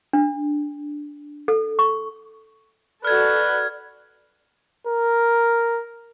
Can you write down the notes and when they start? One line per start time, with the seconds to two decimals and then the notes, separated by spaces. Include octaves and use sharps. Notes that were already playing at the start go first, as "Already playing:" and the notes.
0.13 D4
1.48 A4
1.79 C#6
3.05 F#4 A4 B4 D5 F6 G#6
4.87 A#4